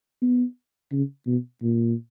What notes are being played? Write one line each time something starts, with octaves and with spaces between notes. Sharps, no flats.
B3
C#3
B2
A#2